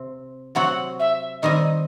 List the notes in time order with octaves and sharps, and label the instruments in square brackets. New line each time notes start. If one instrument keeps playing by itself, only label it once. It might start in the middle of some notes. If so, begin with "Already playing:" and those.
Already playing: [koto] C3 C4
[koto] C3 F#3 C4 F#4 [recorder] F#5
[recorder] E5
[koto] D#3 G3 C4 [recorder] D#5